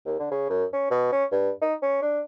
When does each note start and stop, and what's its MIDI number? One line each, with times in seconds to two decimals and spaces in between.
0.06 0.19 39
0.19 0.28 50
0.31 0.49 49
0.50 0.65 42
0.73 0.87 61
0.91 1.10 47
1.12 1.24 61
1.31 1.50 43
1.62 1.75 63
1.82 1.97 61
2.02 2.20 62